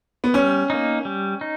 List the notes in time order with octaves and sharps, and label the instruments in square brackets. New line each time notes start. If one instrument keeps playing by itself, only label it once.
[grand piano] B3
[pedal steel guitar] G3 [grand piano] C#4
[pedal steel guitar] A#3 D#4
G3
D#4